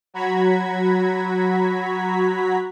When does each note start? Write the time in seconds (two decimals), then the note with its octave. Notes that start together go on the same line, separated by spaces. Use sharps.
0.14 F#3 F#4 A#5 B5 G#6 B6